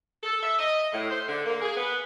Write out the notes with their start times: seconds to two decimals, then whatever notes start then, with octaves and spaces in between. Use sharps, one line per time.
0.22 A4
0.43 E5
0.58 D#5
0.92 A2
1.10 C5
1.29 D3
1.45 A#3
1.62 G#4
1.77 B3